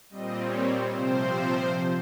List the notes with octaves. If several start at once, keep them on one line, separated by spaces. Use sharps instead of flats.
A#2 G3 C4 D#5
C#5
C5
C3 F3 C4 C5